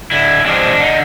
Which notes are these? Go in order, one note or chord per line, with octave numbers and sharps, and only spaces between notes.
D3 E4
F3 G#3 C4 D4
D3 D#4